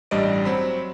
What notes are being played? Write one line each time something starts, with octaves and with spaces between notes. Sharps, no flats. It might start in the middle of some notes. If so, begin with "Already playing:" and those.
A1 G2 G3 D5 D#5 D7
F#3 C4 B5